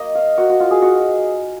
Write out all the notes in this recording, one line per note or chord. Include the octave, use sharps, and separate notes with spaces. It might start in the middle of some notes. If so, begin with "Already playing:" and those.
Already playing: A#3 D#5
F5
A#3 F#4
F#4
F4
G#4
D#4 F#4